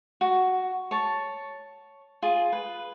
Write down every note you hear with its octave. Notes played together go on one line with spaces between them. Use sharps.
F#4
C#5 A5
F4 G#4
B4